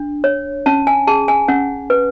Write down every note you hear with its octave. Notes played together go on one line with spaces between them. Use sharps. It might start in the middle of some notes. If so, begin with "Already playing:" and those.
Already playing: D4
C#5
C#4 A5
G#5
G#4 A5
G#5
C#4 F#5
B4